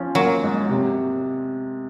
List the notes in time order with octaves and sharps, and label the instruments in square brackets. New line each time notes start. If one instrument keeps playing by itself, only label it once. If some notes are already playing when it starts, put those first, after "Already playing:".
Already playing: [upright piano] F3 C#4
[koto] F#3 [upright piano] A#3
[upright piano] G#2
C3